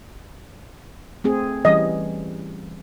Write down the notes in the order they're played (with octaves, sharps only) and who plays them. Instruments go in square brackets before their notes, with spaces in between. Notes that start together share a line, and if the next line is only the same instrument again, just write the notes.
[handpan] A3 C4 G#4
[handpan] E3 G3 C#4 [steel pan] D#5